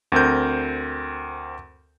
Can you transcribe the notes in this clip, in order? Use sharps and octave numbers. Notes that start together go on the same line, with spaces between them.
D2 C4 A#4 G6